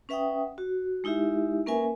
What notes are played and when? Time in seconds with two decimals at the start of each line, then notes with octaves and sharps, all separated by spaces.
0.09 C#4 B4 E5 F#5 G5 D#6
0.58 F#4
1.04 G#3 D#4 E4 G4 E5
1.66 A#3 C#4 A#4 B4 E5 G#5